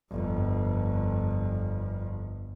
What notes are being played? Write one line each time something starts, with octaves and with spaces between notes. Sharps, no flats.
G1 F2